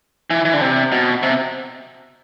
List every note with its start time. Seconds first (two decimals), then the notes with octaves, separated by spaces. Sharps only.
0.30 E3
0.45 E3
0.54 D3
0.61 C3
0.92 B2
1.23 C3